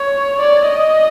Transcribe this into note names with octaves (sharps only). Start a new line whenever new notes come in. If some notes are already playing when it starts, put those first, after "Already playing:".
Already playing: C#5
D5
D#5